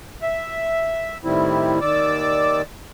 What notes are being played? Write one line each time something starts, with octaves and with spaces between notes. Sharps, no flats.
E5
A2 D#3 G3 C4 E4
D#2 D#3 D5 D6 E6